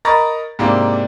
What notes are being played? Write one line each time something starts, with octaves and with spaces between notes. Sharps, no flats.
A#4 D#5 A#5 B5 C#6 A6
G#2 C3 A#3 D4 E4